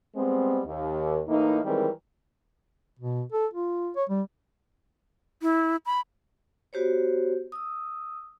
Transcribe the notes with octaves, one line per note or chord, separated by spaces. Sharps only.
G3 G#3 B3 C4
D#2
A2 E3 A#3 D#4
D#3 E3 G3 G#3 C4 A#4
B2
A4
F4
C#5
G3
E4
B5
B3 F#4 G4 C5 C#5
D#6 E6